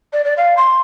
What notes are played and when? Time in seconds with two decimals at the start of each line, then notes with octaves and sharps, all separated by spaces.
0.13 D5
0.25 D5
0.37 F5
0.57 C6